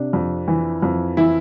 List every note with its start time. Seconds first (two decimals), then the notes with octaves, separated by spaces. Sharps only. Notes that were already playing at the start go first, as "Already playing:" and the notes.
Already playing: C3 D4
0.13 F2
0.48 E3
0.82 F2
1.17 E3 E4